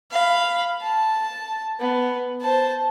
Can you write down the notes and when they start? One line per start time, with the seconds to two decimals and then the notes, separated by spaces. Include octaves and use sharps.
0.12 F5 B5
0.82 A5
1.80 B3
2.41 C5 A5